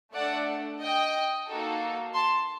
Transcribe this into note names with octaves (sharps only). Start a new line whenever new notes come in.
A3 D4 A4 D5 F#5
D#5 G5
A#3 D#4 F#4 A4
A5 C6